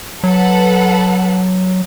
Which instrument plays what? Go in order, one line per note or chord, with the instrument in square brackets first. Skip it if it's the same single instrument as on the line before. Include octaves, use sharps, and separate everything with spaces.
[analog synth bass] F#3 [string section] A4 B4 F#5